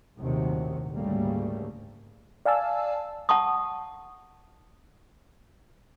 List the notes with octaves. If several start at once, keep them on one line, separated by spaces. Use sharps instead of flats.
A#1 D#2 A2 C3 D#3 F#3
D2 G#2 C#3 G3 A3 A#3
D5 F5 G#5 A5 E6
F#5 A5 C#6 D#6